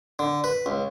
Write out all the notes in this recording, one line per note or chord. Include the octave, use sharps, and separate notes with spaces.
D3
B4
C#2